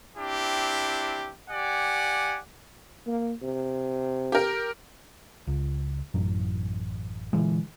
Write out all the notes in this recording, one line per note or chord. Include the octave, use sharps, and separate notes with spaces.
C4 D4 E4 G4
G4 D5 F#5 G#5
A#3
C3
G4 A#4
C#2
A1 F#2 F#3
A#2 D3 E3 G#3